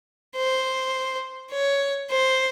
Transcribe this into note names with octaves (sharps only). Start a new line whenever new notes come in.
C5
C#5
C5